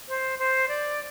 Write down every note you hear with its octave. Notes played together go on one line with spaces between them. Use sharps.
C5
C5
D5